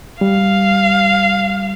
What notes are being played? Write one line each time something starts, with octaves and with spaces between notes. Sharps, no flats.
G3 F5